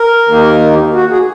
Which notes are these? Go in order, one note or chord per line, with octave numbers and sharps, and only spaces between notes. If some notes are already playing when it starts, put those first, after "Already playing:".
Already playing: A#4
D#2 D#3 A#3 D#4
F#4
G#4